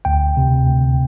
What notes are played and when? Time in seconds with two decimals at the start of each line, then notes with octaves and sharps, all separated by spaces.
0.05 D2 G5
0.37 C3
0.68 D2